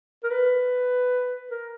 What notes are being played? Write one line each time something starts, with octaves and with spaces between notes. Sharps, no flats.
A#4
B4
A#4